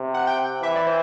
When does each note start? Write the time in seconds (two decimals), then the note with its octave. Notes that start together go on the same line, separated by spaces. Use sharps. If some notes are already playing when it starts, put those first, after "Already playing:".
Already playing: C3
0.14 F#5
0.27 G5
0.63 E3 E5
0.76 D5
0.86 C5